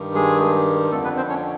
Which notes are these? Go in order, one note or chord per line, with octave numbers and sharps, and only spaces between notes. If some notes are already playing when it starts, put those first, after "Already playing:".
Already playing: G2 D#3
G#3 G#4
F2 D3 A3 A4
B3 B4
C4 C5
C#4 C#5